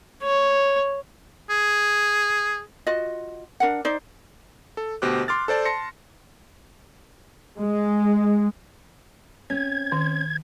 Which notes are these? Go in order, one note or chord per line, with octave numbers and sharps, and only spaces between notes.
C#5
G#4
F4 F#4 D#5
D4 A#4 F#5
D#4 C5 D5
A4
D2 B2 G4 C5 D6 F#6
C6 D6 F6 A6
A4 C5 D5 A5
A5 C6 A#6 C#7
G#3
C4 C#4 G#6
D#3